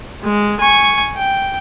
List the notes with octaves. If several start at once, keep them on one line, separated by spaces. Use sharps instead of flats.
G#3
G#5 C#6
G5